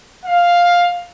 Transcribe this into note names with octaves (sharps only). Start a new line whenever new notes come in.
F5